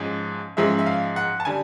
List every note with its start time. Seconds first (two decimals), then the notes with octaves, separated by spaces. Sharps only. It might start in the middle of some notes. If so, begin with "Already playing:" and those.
Already playing: G#2 F3 G#3 C#4 D#5
0.57 G#2 F3 G#3 C#4 E5
0.79 E5
0.86 F5
1.16 F#5
1.40 A5
1.45 D3 G3 G#5